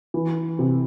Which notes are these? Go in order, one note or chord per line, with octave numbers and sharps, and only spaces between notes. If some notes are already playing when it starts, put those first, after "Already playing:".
E3
C3